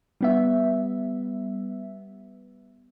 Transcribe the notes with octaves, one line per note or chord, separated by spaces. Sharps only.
G3 B3 E5